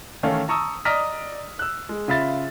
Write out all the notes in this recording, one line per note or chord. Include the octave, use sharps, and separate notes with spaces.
D#3 E3 A3 C#4 F5
A5 A#5 C#6 D#6 E6
D5 D#5 A#5 D#6 F6 B6
E6 F#6
G#3
C#3 F4 E5 B5 A6